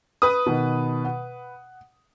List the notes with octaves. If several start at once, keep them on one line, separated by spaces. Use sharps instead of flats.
B4 D#6
B2 D#3
F#5